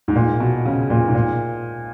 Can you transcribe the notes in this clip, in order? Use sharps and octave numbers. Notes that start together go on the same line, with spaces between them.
G#2
A#2
B2
C#3
A#2
G#2
A#2